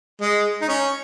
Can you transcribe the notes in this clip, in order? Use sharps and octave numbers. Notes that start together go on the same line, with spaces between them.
G#3
D#4
C#4